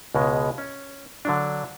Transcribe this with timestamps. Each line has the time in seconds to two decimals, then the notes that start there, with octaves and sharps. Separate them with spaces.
0.15 C#2 B2 G#3
0.58 C#4
1.25 D3 F#3 D4